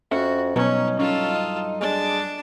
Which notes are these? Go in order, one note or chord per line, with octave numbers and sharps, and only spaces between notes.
F2 C#4 F#4 C5 E5
G2 B2 F#3 C#4 D#4
C#4 F4 A4
D#5
G#3 D4 D5